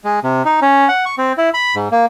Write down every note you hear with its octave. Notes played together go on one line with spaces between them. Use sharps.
G#3
C3
D#4
C#4
F#5
C#6
C4
E4
B5
G#2
A#3